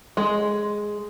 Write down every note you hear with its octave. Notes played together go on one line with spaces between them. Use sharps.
G#3